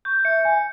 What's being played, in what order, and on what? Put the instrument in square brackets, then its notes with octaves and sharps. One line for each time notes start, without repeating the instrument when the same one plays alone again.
[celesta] C#6 [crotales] G6
[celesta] E5 [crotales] C#7
[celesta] G#5 [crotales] C#7